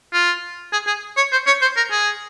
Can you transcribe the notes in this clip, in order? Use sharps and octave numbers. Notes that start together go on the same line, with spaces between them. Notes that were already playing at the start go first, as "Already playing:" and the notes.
F4
G#4
G#4
C#5
C5
C#5
C5
A#4
G#4